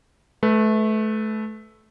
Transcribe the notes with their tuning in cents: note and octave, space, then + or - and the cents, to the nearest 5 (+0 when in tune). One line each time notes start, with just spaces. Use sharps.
A3 -25 B4 +0